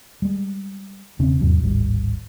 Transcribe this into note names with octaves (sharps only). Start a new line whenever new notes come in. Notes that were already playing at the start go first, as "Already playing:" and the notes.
G3 G#3
E1 C#3 C4 C#4
E2 G#2 C3 F#3
D1 G#1 G3